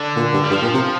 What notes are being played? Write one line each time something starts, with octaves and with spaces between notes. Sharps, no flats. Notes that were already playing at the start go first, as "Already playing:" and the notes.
Already playing: D3
A#2
G2
G3
G2 F3
A#2
C3